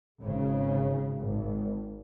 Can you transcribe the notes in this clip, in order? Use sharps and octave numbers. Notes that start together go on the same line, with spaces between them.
G#1 C#3
G#1